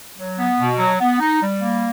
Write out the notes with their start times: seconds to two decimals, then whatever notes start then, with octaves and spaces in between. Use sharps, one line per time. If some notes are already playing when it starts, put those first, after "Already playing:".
0.17 F#3
0.38 B3
0.59 B2
0.79 F#3
0.99 B3
1.20 D#4
1.41 G3
1.61 A#3